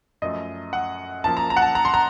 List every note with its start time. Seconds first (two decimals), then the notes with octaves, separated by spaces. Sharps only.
0.22 F#2 F3 A3 D#5
0.73 F#5
1.24 F#2 F3 A#3 A5
1.37 A#5
1.50 A#5
1.57 F#5
1.62 A5
1.75 A#5
1.85 C6
1.94 A#5